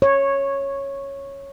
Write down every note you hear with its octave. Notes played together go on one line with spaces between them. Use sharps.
C#5